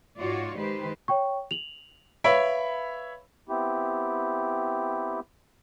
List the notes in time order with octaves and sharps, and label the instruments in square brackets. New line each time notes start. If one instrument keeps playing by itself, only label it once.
[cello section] G#2 F4 F#4 C#5 D5
D#3 G#3 G4 B4 C5
[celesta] C#5 G5 C#6
F7 F#7
[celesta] B4 F5 D7 [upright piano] C#5 E5 B5
[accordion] B3 C4 E4 G4